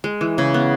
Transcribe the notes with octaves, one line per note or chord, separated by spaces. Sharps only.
G#3
E3
C#3
B3